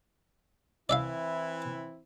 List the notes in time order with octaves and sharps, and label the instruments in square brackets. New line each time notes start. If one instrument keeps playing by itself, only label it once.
[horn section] E3 C4 E4 [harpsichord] D5 E5 F5